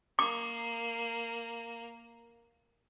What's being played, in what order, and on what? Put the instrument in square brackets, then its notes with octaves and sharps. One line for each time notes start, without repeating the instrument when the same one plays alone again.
[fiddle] A#3 [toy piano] D6